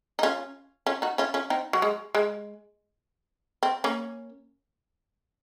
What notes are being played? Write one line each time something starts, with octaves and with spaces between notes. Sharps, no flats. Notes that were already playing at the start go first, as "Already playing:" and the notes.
D#4
C#4 F4
C#4 F4
D#4 F#4
C#4 F4
C#4 F4
C4 D#4
F#3
G#3
G#3
C4
A#3 C#4